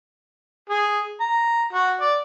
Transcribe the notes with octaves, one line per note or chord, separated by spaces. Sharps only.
G#4
A#5
F#4
D5